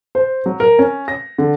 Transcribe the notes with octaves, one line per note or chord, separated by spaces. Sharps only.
C5
F#3
A#4
C#4
A#6
D3